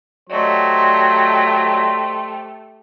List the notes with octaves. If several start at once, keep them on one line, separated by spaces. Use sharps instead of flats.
F#3 A3 G4 C5 D5 D#5 C#6